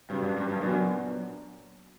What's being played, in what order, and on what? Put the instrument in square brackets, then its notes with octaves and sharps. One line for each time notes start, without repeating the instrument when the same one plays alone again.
[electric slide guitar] G2 [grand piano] C#3 F#3 C#4
[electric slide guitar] G2
G2
G2
[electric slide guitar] F#2 [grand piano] A#2 F#3 B3 D4